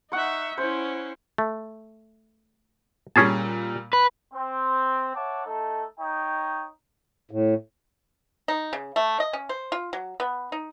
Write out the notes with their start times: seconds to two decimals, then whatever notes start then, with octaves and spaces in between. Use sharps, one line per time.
0.12 D#4 E5 F#5 C#6
0.58 C#4 E4 C5
1.38 A3
3.16 A#2 G3 C#4 G#4 A5
3.93 B4
4.34 C4
5.15 C#5 E5 F#5 A5 D6
5.45 A3 D#4 A4
6.00 D#4 C#5 D#5 G5
7.31 A2
8.48 D#4
8.73 C#3
8.96 A3
9.20 D#5
9.33 C#4
9.49 C5
9.72 F4
9.93 F#3
10.20 B3
10.52 D#4